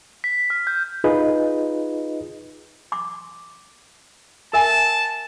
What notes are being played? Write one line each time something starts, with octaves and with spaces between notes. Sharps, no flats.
B6
F6
G6
D#4 F4 G#4 B4 D#5
C6 D6
A#4 E5 G#5 A5